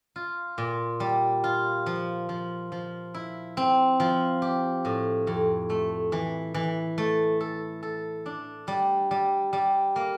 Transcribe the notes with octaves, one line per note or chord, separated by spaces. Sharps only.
F4
A#2
G3
F4
F3
F3
F3
E4
C4
F3
G4
A2
F2
A3
E3
E3
A3
A4
A4
D4
G3
G3
G3
A#3